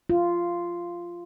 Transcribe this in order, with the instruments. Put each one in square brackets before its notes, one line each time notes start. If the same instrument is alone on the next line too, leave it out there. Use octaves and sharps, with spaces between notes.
[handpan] F4